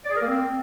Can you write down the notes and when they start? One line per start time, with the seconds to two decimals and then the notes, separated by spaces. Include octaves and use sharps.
0.05 D5
0.10 G#4
0.16 A#4
0.22 A#3
0.27 C4